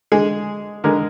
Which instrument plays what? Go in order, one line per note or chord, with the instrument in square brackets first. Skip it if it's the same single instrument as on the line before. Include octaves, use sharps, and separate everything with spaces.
[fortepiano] D3 G#3 G#4
D3 G#3 A#4